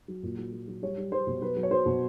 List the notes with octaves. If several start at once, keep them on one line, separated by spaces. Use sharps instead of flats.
F#3
A#2
F#3
F#3
F#3
G3 C#5
G3
G3 C5
B2
F#3 B4
F#3
C#5
F#3 C5
B2